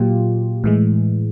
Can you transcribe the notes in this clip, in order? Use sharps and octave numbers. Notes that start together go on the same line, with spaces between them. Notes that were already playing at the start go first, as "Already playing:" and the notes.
Already playing: A#2 F#3 F4 G4
A2 E3 G#3